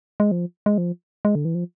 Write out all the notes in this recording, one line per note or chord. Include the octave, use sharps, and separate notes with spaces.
G#3
F3
G#3
F3
G#3
D3
E3
F3